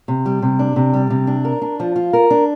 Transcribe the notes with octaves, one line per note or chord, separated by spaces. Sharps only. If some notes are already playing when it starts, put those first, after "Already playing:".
C3
G3
C3
D4
C3
G3
C3
D4
A#4
D4
F3
F4
A#4
D4